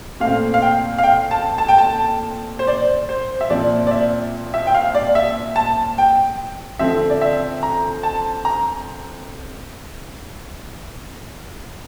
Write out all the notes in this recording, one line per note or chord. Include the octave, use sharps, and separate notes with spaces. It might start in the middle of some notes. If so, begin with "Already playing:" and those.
A#2 A3 C4 F5
F5
G5
F5
G5
A5
A5
G5
A5
C5
D5
C5
E5
A#2 F3 C4 D5
D5
E5
E5
G5
F5
D5
E5
A5
G5
D3 F3 C4 E5
D5
E5
A#5
A5
A#5